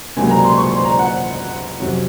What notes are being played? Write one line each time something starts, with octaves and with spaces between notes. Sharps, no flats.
C#2 C3 F#3 A#3 G#5
A#5
C6
C#6
C6
A#5
F#5
F2 C3 F#3 C#4